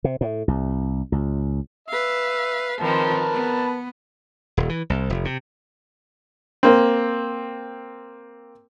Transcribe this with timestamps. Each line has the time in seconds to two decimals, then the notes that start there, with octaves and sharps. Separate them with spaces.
0.04 C3
0.21 A2
0.48 C2
1.12 C#2
1.88 B4 E5 F5
2.80 D#3 F3 C4 A#4 B4 A5
3.32 B3
4.57 D#1
4.69 E3
4.90 C2
5.10 F1
5.25 C3
6.63 A#3 C4